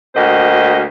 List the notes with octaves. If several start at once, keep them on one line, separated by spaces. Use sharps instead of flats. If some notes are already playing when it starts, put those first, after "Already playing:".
D2 A#3 F#4 C5 D#5